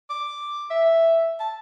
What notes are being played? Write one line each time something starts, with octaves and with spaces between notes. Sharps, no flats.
D6
E5
A5